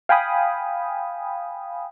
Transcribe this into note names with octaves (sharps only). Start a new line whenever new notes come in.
F5 G5 G#5 B5 D#6